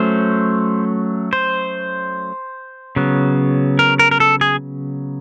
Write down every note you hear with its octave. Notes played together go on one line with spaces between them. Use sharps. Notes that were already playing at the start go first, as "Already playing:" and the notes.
Already playing: F#3 A3 C#4 C5
C5
C#3 F#3 B3
A#4
A#4
A#4
A4
G#4